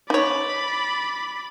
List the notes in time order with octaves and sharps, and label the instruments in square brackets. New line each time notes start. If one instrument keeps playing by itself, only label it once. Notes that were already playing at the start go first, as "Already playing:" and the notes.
[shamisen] D#4 C#5 [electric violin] D5 B5